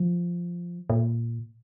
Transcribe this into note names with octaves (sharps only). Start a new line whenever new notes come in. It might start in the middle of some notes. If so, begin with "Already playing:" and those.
Already playing: F3
A#2